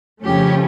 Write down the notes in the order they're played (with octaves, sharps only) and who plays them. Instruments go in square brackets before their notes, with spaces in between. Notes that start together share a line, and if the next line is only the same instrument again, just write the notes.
[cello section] F2 C#3 F3 A3 C#4 G4